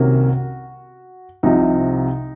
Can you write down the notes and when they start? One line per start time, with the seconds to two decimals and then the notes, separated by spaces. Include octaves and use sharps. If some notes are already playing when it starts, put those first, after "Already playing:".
Already playing: C2 C3 D#3 A#3 C#4 F#4
1.43 C2 C3 F3 D#4